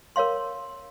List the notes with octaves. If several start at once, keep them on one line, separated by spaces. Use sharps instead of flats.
A#4 C#5 F5 C6